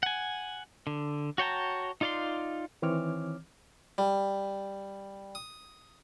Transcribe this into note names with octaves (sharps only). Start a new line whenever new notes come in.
F#5 G#5
D3
F#4 C#5 G5 A5 A#5
D#4 F4 D5 F5 C6
D#3 E3 C4 C#5 D6 F6
G3
D#6